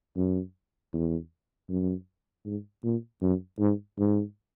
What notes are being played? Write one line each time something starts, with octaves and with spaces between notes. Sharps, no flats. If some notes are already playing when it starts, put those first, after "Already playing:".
F#2
E2
F#2
G#2
A#2
F#2
G#2
G#2